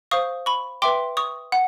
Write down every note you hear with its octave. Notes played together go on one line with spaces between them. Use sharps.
C5 F5 C#6 D#6
B5 C#6
B4 E5 G5 C6 D6
C#6 D#6
F#5